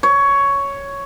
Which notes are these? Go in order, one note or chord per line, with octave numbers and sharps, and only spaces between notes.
C#5